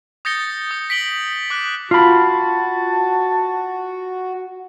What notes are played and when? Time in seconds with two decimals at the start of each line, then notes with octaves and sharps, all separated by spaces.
0.25 D#6 G6 A6 A#6 C#7 G7
0.71 D#6
0.90 B6 D7 F#7 G7
1.50 D6 F#6
1.91 F4 F#4 A5 B5